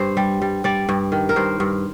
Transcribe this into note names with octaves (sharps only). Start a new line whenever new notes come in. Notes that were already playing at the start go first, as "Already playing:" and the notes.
Already playing: G2 C5
G3
G3
G3 D5
G2
D#3
A#4
G2 C5
G2